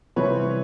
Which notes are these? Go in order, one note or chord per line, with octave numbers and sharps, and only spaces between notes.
C3 E3 G3 C4 B4 C#5